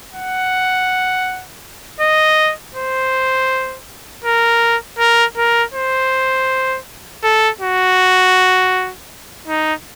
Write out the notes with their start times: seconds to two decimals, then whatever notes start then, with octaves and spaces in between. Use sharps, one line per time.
0.13 F#5
2.00 D#5
2.75 C5
4.25 A#4
4.99 A#4
5.37 A#4
5.74 C5
7.24 A4
7.61 F#4
9.48 D#4